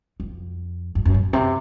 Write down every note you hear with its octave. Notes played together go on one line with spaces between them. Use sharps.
F2
F#2
F#2
A2
C3